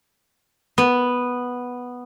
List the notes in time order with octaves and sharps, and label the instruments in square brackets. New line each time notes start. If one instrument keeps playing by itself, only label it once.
[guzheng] B3